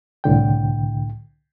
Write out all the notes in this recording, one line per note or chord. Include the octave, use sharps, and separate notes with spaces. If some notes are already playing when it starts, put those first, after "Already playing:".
C2 A2 D3 G5